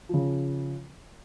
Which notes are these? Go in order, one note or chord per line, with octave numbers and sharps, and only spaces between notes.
C#3 F3